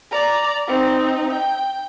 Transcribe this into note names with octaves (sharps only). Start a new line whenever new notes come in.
D5 A#5
C4 D#4
G5